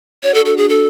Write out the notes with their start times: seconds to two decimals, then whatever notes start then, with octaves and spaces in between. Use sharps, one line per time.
0.23 D4 F#4 C#5
0.34 A4
0.45 A4
0.57 G#4
0.69 A4